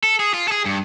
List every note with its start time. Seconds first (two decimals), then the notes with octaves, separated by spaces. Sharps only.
0.03 A4
0.20 G#4
0.34 F4
0.48 G#4 A4
0.66 G2